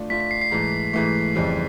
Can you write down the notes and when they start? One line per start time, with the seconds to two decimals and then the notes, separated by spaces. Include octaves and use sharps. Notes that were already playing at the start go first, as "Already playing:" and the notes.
Already playing: A3 D4 F4
0.10 A3 D4 F4 B6
0.20 B6
0.31 C7
0.42 C7
0.51 G#2 E3 A3
0.93 G#2 E3 A3
1.35 F2 C#3 E3 G3 C4